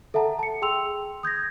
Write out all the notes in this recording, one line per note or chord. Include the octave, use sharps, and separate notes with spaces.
A4 E5 F#5 A5 A#5
A5 C#7
G#4 G5 C6 E6 F7
D#6 G6 G#6 A#6